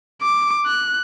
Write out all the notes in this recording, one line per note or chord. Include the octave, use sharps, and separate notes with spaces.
D6
F#6